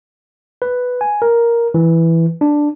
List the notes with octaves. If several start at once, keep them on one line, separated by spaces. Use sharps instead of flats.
B4
G#5
A#4
E3
D4